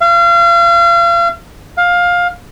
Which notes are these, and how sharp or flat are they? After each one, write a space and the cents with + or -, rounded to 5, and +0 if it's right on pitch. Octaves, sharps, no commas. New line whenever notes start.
F5 -35
F5 +15